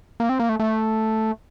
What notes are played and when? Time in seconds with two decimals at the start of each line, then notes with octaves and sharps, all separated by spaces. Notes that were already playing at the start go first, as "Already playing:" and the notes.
0.20 A#3
0.29 C4
0.40 A#3
0.49 A3
0.60 A3